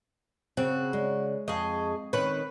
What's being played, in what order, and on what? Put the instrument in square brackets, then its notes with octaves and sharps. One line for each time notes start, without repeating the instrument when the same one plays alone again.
[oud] C#3 [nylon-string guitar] C4 [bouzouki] F#4
[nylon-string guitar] G#3 [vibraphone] C#5 D5
[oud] F2 [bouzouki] G#4 D#5 [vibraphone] A5 C#6
[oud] D#3 C#4 [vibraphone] C4 [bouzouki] B4